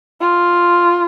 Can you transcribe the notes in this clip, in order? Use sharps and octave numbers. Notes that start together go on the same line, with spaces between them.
F4